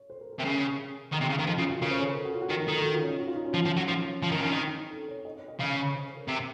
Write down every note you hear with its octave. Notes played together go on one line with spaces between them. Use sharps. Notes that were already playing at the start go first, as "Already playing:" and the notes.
Already playing: C#5
C5
A#4
A#4
C3
C#3 C5
D#3 D#5
C3
C#3
D#3
F3 D#5
C#3 F4
F#4
C#3 A#4
C5
C#5
A#4
A4
F#4
F4
F#4
D#3 A#4
A#4
D#3 A4
F#4
F4
C#4
D#4
F#4
F4
D#4
C#4
F3
F3
F#3
F3 C#4
F3
D#3
C#3
D#3
C4
D#4
A4
C#5
D#5
C#5
D#5
C#3 D#5
C#5
C#5
C5
C5
A#4
C3 C4